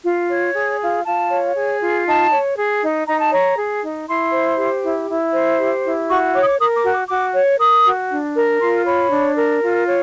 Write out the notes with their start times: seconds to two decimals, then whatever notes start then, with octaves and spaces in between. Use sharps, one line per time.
0.04 F4
0.29 C#5
0.54 G#4
0.81 F4
1.05 F4 A5
1.30 C#5
1.55 G#4
1.81 F4
2.05 D#4 A5
2.31 C#5
2.56 G#4
2.82 D#4
3.06 D#4 A#5
3.21 A5
3.31 C#5 A#5
3.57 G#4
3.82 D#4
4.08 E4 C6
4.32 C5
4.58 G4
4.82 E4
5.09 E4
5.34 C5
5.59 G4
5.84 E4
6.08 F#4 C#6
6.34 C#5 D6
6.42 D#6
6.49 D6
6.59 A#4 D#6
6.76 D6
6.85 F#4
6.93 D6
7.09 F#4 D6
7.34 C#5
7.59 A#4 D#6
7.85 F#4
8.10 D4
8.36 A#4
8.60 F4 C6
8.85 C#5 B5
9.10 D4
9.36 A#4
9.62 F4
9.87 C#5